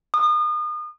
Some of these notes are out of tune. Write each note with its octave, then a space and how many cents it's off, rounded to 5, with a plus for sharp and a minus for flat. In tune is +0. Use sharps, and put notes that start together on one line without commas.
D#6 -35